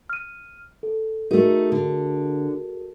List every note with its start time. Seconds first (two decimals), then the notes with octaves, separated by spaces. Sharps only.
0.09 F6 D#7
0.83 A4
1.31 A3 D#4 F#4 G#4 A#4
1.72 D3